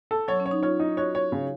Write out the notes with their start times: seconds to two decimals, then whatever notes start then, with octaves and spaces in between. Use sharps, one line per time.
0.11 A4
0.28 F#3 C#5
0.40 C#4
0.46 C#5
0.51 D#4
0.63 F4 C#5
0.80 D#4
0.97 F#4 C#5
1.15 C#5
1.32 C#3